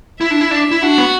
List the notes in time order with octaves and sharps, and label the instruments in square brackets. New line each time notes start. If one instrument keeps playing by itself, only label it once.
[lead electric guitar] E4 [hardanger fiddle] E5
[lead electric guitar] D4
E4
D4
E4
[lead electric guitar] D4 [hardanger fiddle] F#4
[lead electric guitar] B3